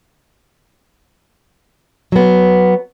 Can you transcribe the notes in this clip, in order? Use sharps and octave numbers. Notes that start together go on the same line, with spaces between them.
F#3 B3